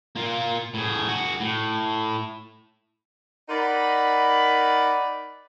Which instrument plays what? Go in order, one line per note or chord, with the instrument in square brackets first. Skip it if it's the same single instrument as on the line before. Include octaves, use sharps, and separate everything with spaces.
[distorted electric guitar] A#3 F4
A2 G#4
F#4 G#4
A2
[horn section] D#4 A#4 D5 F#5 B5